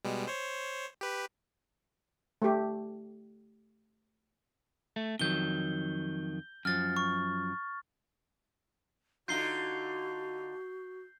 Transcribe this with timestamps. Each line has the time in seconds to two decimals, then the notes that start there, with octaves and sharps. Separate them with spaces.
0.05 B2 G3 G#3
0.28 C5 C#5
1.01 G4 B4
2.42 A3 G4
4.96 A3
5.19 F2 D#3 F#3 G6 G7
6.65 F#2 F3 F6 A6
6.97 C#6
9.28 D3 D#4 F4 F#4 G6 C7 G7